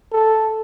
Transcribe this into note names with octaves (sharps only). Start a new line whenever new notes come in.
A4